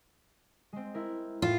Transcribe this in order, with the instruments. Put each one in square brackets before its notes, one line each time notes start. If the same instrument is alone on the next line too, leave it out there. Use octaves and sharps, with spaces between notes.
[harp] G#3 C4
E4 A#4
[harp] A2 E7 [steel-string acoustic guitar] F4